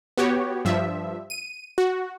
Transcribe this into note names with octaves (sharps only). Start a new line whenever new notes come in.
B3 F#4 G4 C#5
G2 F3 E5
D#7
F#4